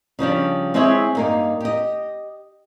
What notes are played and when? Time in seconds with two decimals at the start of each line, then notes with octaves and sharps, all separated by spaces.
0.19 C#3 F3 G3 D4
0.74 G#3 C4 E4 G#4 C#5 E5
1.15 G2 A#3 D#4
1.61 G4 D#5